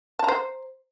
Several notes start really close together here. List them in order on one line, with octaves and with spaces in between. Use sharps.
A5 A#5 C5